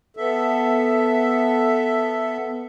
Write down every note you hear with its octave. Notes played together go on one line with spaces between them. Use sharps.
B3 A4 E5